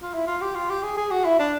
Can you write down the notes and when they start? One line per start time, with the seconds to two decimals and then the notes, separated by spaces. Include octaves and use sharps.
0.02 F4
0.14 E4
0.27 F4
0.41 G4
0.55 F4
0.70 G4
0.83 G#4
0.97 G#4
1.11 F#4
1.25 E4
1.39 D4